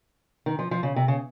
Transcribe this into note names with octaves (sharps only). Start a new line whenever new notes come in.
D#3
F3
F3
C#3
C3
C#3